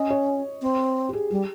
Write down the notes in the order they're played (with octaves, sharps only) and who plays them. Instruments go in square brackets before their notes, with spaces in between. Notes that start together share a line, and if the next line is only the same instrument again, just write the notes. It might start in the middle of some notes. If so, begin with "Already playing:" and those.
Already playing: [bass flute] C#4 [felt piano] D#5
[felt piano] C#5
[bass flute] C4
[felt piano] G4
G#4
[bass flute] G3 [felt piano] G4